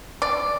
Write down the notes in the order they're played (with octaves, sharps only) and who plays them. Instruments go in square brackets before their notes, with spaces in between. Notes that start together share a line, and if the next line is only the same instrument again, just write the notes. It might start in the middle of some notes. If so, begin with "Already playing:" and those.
[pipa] D5